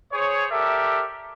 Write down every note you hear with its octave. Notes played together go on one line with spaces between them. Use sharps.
G#4 C5 C#5
G4 A4 A#4 D5 E5